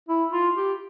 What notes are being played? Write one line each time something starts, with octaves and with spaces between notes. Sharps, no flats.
E4
F4
G4